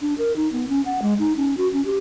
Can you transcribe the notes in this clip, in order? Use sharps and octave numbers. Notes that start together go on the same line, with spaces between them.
D4
A#4
D#4
B3
C#4
F#5
G#3
D#4
C#4
F#4
C#4
G4